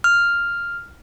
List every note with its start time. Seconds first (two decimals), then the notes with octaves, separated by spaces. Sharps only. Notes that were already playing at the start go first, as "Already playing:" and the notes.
0.04 F6